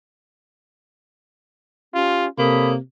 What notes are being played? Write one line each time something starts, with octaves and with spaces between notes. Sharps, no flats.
C#4 F4 G4
C3 A#3 A4 C#5 B5 D#6